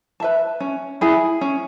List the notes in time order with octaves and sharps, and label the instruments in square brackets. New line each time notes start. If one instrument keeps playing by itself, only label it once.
[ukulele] B4 E5 A5
C#4
E4 G#4
C#4